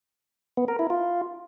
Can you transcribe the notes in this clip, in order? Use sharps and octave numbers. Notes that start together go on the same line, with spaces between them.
B3
A#4
E4
F4